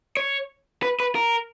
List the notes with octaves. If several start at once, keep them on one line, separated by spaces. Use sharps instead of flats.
C#5
B4
B4
A#4